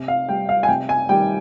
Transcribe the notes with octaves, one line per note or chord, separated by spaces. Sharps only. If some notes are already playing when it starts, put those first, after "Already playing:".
Already playing: C3
F5
G3 G5
F5
G#5
C3 G5
G#5
D#3 G3 G5